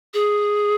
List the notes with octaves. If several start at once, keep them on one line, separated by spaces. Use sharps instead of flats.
G#4